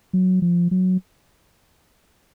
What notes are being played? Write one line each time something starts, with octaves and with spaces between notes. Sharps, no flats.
F#3
F3
F#3